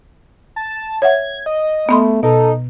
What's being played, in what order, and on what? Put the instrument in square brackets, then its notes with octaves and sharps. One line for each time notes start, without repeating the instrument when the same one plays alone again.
[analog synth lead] A5
[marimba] C#5 E5 F#5 [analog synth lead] G#6
[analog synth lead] D#5
[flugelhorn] A3 [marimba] B3 B5 C6
[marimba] B2 [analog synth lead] D#4 [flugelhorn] A4